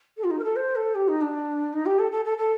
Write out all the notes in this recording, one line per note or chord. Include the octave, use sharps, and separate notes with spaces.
A4
F4
D#4
A#4
A4
C5
A4
G4
D#4
D4
D#4
G4
A4
A4
A4
A4